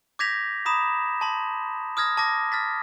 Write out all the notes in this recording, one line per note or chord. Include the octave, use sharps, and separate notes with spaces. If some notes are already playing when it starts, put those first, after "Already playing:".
D6 G6 G#6 A#6 B6 F7
A#5 B5 D#6 E7
A5 C6
D#6 F6 G#6 A#6
A5 D6 A#6
F6 A6 B6